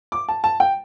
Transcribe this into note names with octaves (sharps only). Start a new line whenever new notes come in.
D6
A5
A5
G5